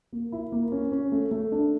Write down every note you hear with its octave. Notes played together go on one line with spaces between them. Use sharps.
A#3
E4
A#3
C#4
C#4
A3
A3
D4